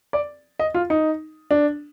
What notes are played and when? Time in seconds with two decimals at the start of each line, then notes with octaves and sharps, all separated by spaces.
0.13 D5
0.59 D#5
0.74 F4
0.90 D#4
1.51 D4